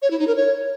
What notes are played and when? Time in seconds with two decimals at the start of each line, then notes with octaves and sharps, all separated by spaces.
0.02 C#5
0.11 E4
0.19 D#4
0.27 A#4
0.36 C#5